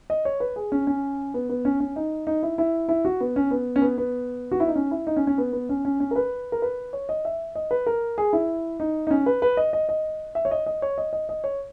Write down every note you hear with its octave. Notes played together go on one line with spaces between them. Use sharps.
D#5
C#5
B4
G#4
C#4
C#4
B3
B3
C#4
C#4
D#4
D#4
E4
E4
E4
F#4
B3
C#4
B3
C#4
B3
B3
F#4
E4
D#4
C#4
E4
D#4
C#4
C#4
B3
B3
C#4
C#4
C#4
A#4
B4
A#4
B4
C#5
D#5
E5
D#5
B4
A#4
G#4
E4
D#4
D#4
C#4
B4
B4
D#5
D#5
D#5
E5
C#5
D#5
D#5
C#5
D#5
D#5
D#5
C#5